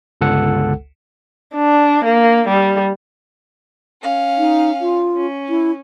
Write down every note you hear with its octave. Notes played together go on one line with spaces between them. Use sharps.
G1 C#2 A4 F#5
D4
A#3
G3
C#4 F5
D#4
F4
C#4
E4